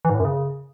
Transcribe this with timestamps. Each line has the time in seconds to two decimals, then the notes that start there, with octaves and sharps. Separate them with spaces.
0.05 E3
0.10 G#2
0.15 A2
0.20 F#2
0.25 C#3